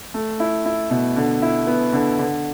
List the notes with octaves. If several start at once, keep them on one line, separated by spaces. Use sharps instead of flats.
A3
E4
E4
B2
D3
E4
B3
D3
D3